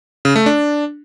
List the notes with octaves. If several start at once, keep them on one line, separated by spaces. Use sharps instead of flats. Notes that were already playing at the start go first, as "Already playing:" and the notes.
C#3
A3
D4